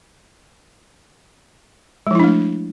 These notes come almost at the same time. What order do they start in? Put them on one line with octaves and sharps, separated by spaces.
G#3 F3 E4 D4 A3